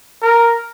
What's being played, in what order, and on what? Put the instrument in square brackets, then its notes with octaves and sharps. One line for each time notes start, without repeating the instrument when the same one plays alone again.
[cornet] A#4